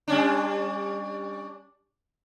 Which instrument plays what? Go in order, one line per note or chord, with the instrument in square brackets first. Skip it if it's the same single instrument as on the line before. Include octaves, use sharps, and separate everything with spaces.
[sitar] G3 C#4 D4